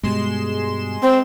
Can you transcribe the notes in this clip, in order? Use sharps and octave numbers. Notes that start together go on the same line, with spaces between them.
G2 B2 G3 G#3 C6 E7
C4 C5